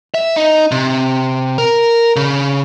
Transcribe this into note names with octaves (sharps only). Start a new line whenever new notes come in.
E5
D#4
C3
A#4
C#3